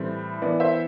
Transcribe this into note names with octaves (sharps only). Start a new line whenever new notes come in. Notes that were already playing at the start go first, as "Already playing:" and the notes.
Already playing: A2 E3 G3 C4
E3 B3 D5
C5 E5